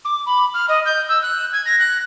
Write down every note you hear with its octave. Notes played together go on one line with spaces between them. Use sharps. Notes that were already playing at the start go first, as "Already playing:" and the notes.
D6
B5
F6
D#5
G6
E6
F#6
G#6
A#6
F#6